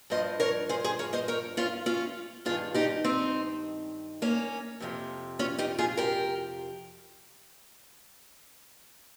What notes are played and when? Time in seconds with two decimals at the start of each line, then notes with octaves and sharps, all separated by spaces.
0.10 G2 F3 C5 D#5
0.40 A#4 C#5
0.69 G#4 C5
0.84 G#4 C5
0.99 A#4 C#5
1.13 C5 D#5
1.28 A#4 C#5
1.57 C#4 F4
1.86 C#4 F4
2.45 G2 D#3 F4 G#4
2.74 D#4 G4
3.04 C4 D#4
4.22 A#3 C#4
4.80 F2 C3 F3
5.39 C#4 F4
5.58 D#4 G4
5.78 F4 G#4
5.97 G4 A#4